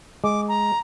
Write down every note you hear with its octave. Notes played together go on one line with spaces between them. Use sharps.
G#3 D6
A#5